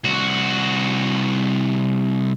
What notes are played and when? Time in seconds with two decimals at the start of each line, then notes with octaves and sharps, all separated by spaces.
0.04 C2 F#4